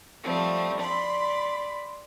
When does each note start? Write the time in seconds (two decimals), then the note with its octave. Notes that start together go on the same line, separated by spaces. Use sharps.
0.23 F3 G3 A3 C4
0.79 D5 B5 C6